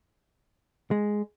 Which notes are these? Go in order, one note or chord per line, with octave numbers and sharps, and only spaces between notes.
G#3